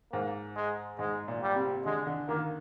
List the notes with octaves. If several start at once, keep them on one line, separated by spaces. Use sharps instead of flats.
G#2 A#3
G#3
G#2 G#3
A#2
G3
C3
D3 G#3
D3
D#3 A#3